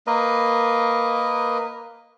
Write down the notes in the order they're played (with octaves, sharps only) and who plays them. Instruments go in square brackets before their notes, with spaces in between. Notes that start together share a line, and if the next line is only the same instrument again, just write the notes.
[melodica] A#3 A#4 B4 D#5